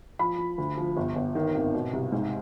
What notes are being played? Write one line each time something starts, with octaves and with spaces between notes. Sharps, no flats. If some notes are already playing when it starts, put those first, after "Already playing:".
F3 B5
F3
D2
F3
G1
G1
D#3
G#1
B2
C2
G#2